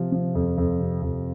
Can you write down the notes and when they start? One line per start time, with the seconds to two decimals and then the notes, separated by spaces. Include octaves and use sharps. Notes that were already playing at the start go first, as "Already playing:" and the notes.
Already playing: C3 F3
0.12 F3
0.35 F2
0.58 F2
0.79 C3
1.02 F2